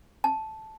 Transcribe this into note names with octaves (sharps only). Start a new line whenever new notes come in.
A5